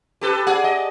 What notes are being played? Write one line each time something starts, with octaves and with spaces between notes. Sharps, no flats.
G4 A4 B4
G#4 D5 F#5
D#5